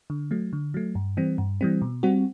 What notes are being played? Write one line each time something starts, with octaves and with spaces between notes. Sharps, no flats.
D3
F#3 A3
D3
F#3 A3
G2
E3 G3 C4
G2
E3 G3 C4
B2
G3 C4 F#4